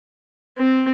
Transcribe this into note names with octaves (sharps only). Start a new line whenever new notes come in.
C4